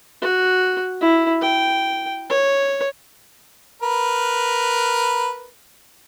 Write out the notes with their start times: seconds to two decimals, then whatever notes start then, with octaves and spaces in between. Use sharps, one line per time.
0.21 F#4
1.01 E4
1.42 G5
2.29 C#5
3.82 A#4 B4